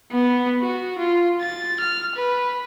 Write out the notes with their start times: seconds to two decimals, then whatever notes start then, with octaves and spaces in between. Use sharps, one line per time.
0.12 B3
0.61 F#4
0.99 F4
1.42 A6
1.80 F6
2.16 B4